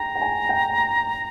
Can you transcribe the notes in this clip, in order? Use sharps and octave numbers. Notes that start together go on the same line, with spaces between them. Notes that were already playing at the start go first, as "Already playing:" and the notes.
Already playing: G5 A#5
G5
G#5
G5